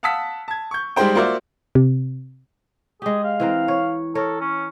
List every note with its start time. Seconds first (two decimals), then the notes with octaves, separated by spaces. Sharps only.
0.03 F5 F#5 A5 D#6 E6 B6
0.48 A5 G#6
0.71 C#6 G6
0.96 G3 G#3 D#4 G4 C5 G5
1.15 A#3 F4 F#4 C5 D5 E5
1.75 C3
3.02 G#3 G4 G#4
3.24 F5
3.40 E3 C4 A#4
3.68 C#5
4.15 A4 A#4 C#5
4.40 C#4